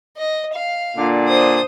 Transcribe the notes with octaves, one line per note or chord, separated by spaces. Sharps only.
D#5
F5
A#2 D3 D4
C5 D#6